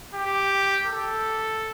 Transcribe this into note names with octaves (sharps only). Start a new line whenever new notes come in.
G4
A4